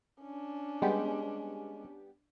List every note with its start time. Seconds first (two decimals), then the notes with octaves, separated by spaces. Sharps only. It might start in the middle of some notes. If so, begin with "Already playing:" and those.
0.22 C#4 D4
0.82 G3 G#3 B3 G4